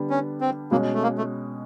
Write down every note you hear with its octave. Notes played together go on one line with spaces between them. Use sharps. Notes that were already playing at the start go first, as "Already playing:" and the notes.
Already playing: D3 G3 B3 D4
C#4
C4
B2 G#3 A#3 C#4
A3
A#3
A3